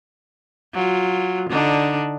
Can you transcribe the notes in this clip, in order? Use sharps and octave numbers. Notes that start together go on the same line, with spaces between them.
F#3 F4
D3 D4 D#4